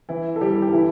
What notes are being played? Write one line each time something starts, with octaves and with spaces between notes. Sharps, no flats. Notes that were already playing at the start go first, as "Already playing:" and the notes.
E3 E4
A4
G3 G4
G4
E3 E4